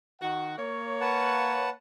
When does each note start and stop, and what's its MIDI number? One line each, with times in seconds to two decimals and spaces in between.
0.21 0.56 51
0.21 0.56 66
0.21 0.56 78
0.58 1.73 58
0.58 1.73 73
1.01 1.70 71
1.01 1.70 78
1.01 1.70 81